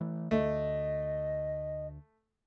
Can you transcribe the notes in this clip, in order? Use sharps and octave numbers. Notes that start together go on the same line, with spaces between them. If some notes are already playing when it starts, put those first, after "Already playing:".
E3 A3
D2 A3 D#5